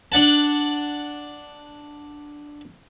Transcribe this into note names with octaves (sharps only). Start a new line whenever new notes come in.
D4 F#5 A5